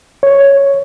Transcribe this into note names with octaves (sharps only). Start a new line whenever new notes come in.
C#5